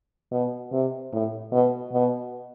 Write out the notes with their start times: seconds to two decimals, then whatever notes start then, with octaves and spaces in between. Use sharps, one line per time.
0.32 B2
0.72 C3
1.13 A2
1.52 B2
1.93 B2